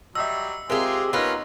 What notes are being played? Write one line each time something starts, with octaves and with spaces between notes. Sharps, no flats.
F#3 G3 D#5 E5 E6
G#3 C4 F4 G4 G#4 A#4 E5
B3 C#4 D#4 F4 A#4 B4